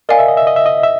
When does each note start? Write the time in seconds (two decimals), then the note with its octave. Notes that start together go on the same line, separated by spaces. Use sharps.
0.09 A#4 D5 D#5 F5 G#5
0.19 E5
0.28 D#5
0.37 E5
0.47 D#5
0.56 E5
0.66 D#5
0.83 E5